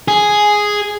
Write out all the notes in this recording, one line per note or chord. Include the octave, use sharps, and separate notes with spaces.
G#4